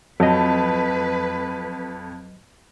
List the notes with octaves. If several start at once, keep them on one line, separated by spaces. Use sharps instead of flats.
F2 F#3 B4 D#5